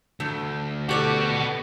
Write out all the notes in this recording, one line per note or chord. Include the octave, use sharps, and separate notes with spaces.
D2 A3
B3 F#4 G4 A4 D5